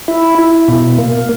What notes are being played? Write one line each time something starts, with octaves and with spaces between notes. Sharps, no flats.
E4
E4
B2
A#3